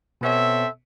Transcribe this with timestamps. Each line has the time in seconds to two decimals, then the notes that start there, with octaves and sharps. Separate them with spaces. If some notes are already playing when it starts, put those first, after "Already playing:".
0.21 B2 B3 C4 A4 C#5 E5